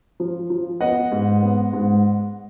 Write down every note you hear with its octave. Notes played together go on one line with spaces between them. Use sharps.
F3
F3
B3 D#5 F#5
G#2
B3
G#2